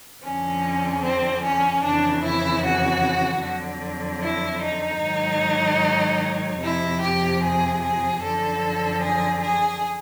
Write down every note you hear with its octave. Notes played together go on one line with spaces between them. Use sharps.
F2 D3 F3 C#4
C4
C#4
F2 C#3 E3 D4
E4
F#4
F2 D3 F#3
E4
D#4
G#2 D#3 F#3
F2 C3 F3 E4
G4
G#4
G#4
F#2 D3 F3 A4
G#4
G#4